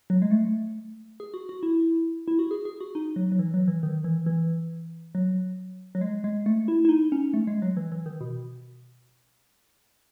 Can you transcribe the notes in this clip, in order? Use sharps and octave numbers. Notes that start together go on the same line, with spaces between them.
F#3
G#3
A3
G#4
F#4
F#4
E4
E4
F#4
G#4
G#4
F#4
D#4
F#3
F#3
E3
F#3
E3
D#3
E3
E3
F#3
F#3
G#3
G#3
A3
E4
E4
D#4
C#4
A3
G#3
F#3
E3
E3
D#3
B2